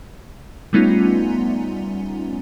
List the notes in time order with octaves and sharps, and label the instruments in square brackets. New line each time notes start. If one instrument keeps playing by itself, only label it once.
[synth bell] G3 A3 B3 C#4 D#4 F4